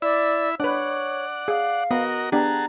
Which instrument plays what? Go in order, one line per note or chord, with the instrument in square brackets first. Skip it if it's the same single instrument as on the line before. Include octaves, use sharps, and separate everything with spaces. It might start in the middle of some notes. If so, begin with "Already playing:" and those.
[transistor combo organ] E4 E5 B5 [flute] D5
[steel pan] D4 B4 [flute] C#5 [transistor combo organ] D5 F#5
[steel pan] G#4 [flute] F5
[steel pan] B3 [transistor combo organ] F#4 A#4 D#5
[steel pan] B3 D4 G4 [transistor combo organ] G#4 F#5 A5 [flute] A#5